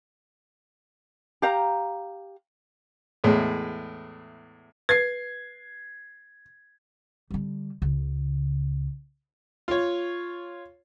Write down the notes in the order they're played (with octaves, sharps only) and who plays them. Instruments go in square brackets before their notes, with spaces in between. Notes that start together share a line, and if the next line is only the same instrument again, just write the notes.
[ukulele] G4 F5 A#5
[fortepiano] E2 A2 G#3
[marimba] B4 [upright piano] G#6 C7
[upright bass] D3 G3
C#2 C#3
[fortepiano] F4 C#5